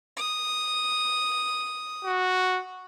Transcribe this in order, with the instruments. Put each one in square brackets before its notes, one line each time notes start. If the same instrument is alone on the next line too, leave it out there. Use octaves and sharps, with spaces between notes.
[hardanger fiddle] D#6
[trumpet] F#4